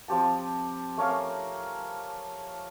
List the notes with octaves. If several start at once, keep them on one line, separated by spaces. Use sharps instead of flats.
F3 C4 G4 A5
A3 C#4 A#4 F5